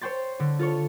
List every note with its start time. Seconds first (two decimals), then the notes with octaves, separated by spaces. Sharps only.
0.01 C5 C#5 G5 C6 A6
0.40 D3
0.59 F4 A4 C#5